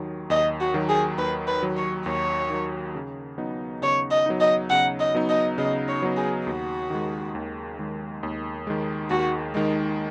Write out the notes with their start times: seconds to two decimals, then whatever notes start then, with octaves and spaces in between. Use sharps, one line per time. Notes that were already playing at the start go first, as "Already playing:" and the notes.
Already playing: D#2 D#3 F#3
0.30 D#2 D#5
0.60 F#4
0.74 D#3 F#3
0.89 G#4
1.18 D#2 B4
1.47 B4
1.62 D#3 F#3
1.77 C#5
2.06 D#2 C#5
2.50 D#3 F#3
2.95 C#3
3.38 F#3 B3 D#4
3.82 C#3 C#5
4.11 D#5
4.26 F#3 B3 D#4
4.41 D#5
4.70 C#3 F#5
5.00 D#5
5.15 F#3 B3 D#4
5.29 D#5
5.58 C#3 D#5
5.88 C#5
6.02 F#3 B3 D#4
6.17 G#4
6.46 D#2 F#4
6.90 D#3 G#3
7.35 D#2
7.79 D#3 G#3
8.23 D#2
8.67 D#3 G#3
9.10 D#2 F#4
9.54 D#3 G#3 D#4